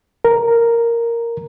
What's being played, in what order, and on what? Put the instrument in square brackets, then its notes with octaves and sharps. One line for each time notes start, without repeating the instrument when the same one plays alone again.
[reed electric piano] A#4